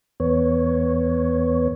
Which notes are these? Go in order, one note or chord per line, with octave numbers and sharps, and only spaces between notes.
E2 B3 C#5